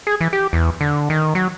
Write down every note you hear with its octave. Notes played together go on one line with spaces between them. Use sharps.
G#4
E3
G4
E2
D3
D#3
F#3